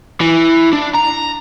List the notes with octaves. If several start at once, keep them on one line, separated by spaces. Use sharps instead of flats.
E3
D4
A#5